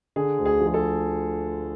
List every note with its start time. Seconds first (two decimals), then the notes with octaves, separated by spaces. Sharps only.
0.16 D3 G#4
0.38 D2
0.46 G#4
0.60 F3
0.67 G#4
0.74 A4